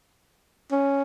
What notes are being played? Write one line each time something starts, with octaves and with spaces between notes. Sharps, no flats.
C#4